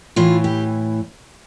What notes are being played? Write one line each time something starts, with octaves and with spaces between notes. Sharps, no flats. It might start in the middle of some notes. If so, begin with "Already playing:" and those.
A2 E3 F4
G4